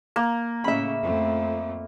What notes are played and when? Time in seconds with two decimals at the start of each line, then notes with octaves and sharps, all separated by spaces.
0.16 A#3
0.64 A2 C#3 E5 B5
1.03 F2 A3